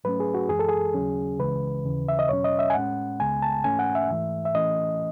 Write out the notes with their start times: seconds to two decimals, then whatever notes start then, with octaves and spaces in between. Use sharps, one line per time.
0.04 G#2 F#3 A3 C#4 B4
0.20 G#4
0.34 F#4
0.49 F#2 E3 G#3 G#4
0.59 A4
0.69 G#4
0.94 D#2 C#3 F#3 C#4
1.39 C#2 C#3 E3 G#3 B4
1.85 D#2 C#3 E3
2.09 E5
2.19 D#5
2.29 E2 B2 F#3 C#4 C#5
2.44 D#5
2.59 E5
2.70 G#5
2.74 A2 G#3 C#4 F#5
3.20 C#2 C#3 G#3 B3 G#5
3.42 A5
3.64 G#2 E3 A3 C#4 G#5
3.79 F#5
3.95 E5
4.09 G#2 E3 A3
4.45 E5
4.54 A2 E3 A3 C#4 D#5